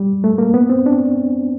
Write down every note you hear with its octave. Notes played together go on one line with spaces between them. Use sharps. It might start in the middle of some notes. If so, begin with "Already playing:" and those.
Already playing: G3
A3
A#3
B3
C4
D4